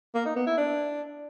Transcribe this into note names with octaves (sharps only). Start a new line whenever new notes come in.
A#3
D#4
B3
E4
D4